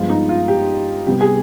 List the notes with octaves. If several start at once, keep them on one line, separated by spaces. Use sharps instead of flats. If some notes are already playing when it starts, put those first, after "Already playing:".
Already playing: G2 F3 G#3 B3 F4
D#4
F4
G4
C3 G3 B3 G4
G#4